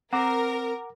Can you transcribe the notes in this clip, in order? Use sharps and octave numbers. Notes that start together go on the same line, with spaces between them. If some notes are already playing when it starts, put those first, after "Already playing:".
C4 A#4 F#5 A#5 D6